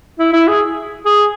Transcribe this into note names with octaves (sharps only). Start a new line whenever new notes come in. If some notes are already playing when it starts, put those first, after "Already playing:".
E4
E4
G#4
G#4